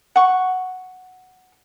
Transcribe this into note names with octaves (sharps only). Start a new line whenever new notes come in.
F#5 C#6